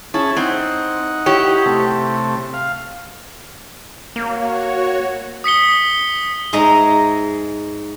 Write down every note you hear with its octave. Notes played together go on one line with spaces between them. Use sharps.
C#4 E4 G#4 A5
C4 D#4 F#5
E4 G4 C#5
C3 A3
F5
A#3 F#4 C#5
D#6 B6 C#7 G7
G#2 G#3 D#5 E5 A#5